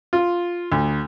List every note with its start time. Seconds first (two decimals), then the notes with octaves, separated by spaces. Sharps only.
0.13 F4
0.72 D2